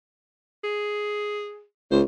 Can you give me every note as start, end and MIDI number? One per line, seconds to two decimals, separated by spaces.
0.64 1.63 68
1.91 2.03 37
1.91 2.01 72